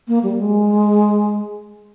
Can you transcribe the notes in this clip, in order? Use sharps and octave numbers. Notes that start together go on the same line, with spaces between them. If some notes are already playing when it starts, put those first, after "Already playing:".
A#3
G3
G#3